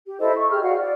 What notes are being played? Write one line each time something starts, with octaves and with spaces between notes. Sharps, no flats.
G4
E4 A4 C5 D#5
C#6
G4 G#4 F6
F#4 D5 F5 F#5
D5